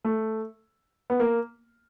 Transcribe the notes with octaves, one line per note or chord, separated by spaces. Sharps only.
A3
B3
A#3